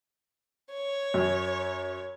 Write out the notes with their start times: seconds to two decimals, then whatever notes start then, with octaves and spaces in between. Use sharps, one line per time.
0.72 C#5
1.14 F#2